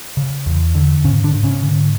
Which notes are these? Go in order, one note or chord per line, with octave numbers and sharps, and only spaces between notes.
C#3
E2
D3
G#2 C#3 C#4
D3 D4
G#2
C#3 C#4
D3